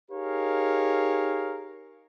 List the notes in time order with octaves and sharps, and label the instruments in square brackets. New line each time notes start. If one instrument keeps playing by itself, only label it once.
[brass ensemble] D#4 G4 G#4 A#4 C#5 F5